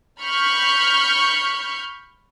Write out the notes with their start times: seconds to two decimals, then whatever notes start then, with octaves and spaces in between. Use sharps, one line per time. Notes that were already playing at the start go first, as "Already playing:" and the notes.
0.21 B5 C#6 F6 G6